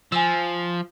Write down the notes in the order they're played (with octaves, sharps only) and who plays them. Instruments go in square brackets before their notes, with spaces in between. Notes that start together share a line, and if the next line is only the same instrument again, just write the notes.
[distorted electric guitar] F3 [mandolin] G#5 E6